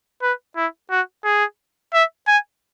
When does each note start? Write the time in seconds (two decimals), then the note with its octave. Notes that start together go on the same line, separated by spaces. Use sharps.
0.22 B4
0.56 E4
0.90 F#4
1.24 G#4
1.93 E5
2.27 G#5